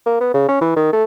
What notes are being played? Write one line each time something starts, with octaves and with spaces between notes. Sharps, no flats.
A#3
B3
C#3
C#4
E3
D#3
A3